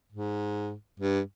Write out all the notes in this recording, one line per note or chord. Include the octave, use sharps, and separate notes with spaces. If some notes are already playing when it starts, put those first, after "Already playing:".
G#2
G2